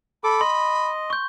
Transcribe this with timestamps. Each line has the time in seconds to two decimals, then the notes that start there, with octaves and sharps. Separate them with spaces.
0.24 A4 B5 D6
0.41 D#5 C6
1.10 C#6 G6